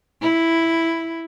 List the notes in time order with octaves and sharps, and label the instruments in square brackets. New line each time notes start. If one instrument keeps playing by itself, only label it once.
[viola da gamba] E4